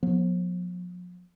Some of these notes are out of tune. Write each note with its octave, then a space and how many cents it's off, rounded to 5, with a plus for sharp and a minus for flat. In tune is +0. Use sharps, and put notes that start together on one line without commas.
F3 +40 B3 -30